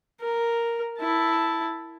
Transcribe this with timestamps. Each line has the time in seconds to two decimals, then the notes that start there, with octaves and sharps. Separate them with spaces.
0.20 A#4
0.99 E4 A5